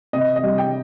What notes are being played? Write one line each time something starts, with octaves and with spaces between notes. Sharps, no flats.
C3 D#5
D#5
G3
G5